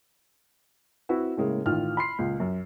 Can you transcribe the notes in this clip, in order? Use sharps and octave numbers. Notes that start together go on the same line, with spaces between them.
C4 E4 F#4 B4
A2 C#3 G#3 A#3
A1 D#3 F4 F6
B5 C6 C7
C#2 A#2
F#2